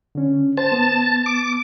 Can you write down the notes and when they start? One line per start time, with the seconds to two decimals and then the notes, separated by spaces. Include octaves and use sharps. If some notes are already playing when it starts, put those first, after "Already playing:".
0.15 D3 C#4
0.58 C5 A5
0.72 B3
1.26 D6